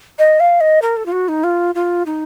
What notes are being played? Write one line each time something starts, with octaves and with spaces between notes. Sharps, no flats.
D#5
F5
D#5
A#4
A4
F4
F#4
D#4
F4
F4
D#4